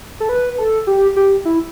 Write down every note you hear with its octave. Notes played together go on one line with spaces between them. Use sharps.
A4
B4
A4
G4
G4
E4